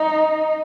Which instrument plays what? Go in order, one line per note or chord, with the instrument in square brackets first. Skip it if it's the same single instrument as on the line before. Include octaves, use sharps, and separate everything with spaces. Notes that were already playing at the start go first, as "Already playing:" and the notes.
Already playing: [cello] D#4